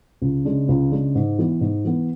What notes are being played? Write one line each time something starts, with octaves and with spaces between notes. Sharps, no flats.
C#2
C#3 G#3 D4
C#2
C#3 G#3 D4
G#2
E3 B3
G#2
E3 B3